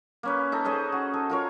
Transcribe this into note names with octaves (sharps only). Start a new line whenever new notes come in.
A#3 C#4 B4
D#4 A4
C#4 G#4 C5 D#5
F#4
A4
F4 A#4 C#5